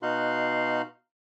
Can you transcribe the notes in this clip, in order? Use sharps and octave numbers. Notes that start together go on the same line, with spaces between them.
B2 D#4 F#4 F5 C6 F#6